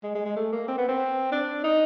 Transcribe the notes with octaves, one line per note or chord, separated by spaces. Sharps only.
G#3
G#3
G#3
A3
A#3
C4
B3
C4
D4
D#4